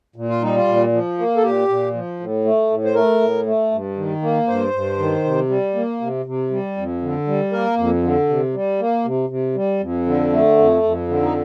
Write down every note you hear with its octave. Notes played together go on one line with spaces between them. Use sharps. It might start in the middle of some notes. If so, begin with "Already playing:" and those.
A#2
F4
G3 D#4
F4
A#2
F3
A#3
A4
A#2 G4
A#2
F3
A2
A3
A2
C5
A3 A#4
A2
A3
G2
D#3
A#3
G2 C5
G2
D#3
C3
G3
A#3
C3
C3
G3
F2
D3
G3
A#3 A#4
F2
D3
C3
G3
A#3
C3
C3
G3
F2
D3
A3
F2
F2
D3
D#4